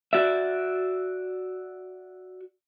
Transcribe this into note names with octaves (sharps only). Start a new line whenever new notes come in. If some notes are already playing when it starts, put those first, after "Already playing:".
F#4 D5 E5